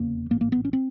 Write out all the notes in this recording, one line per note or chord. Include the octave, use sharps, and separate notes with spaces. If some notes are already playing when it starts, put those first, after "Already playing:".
Already playing: F1 E2 C#3 A#3
A1 G#2 A#3
A#3
B3
C#4
C4